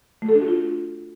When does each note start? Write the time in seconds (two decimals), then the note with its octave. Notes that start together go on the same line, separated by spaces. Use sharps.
0.22 A3
0.29 A4
0.35 D4
0.41 F#4
0.48 F4